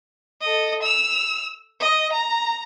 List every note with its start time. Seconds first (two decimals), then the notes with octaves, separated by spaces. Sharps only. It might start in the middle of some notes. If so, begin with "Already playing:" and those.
0.41 A4 D#5
0.82 E6 F7
1.80 D#5
2.12 A#5